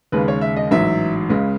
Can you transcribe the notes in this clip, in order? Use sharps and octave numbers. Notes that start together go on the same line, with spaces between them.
D#2 C#3 G#3 B4
C#5
E5
D#5
A1 G#2 F#3 E5
C#2 C#3 G#3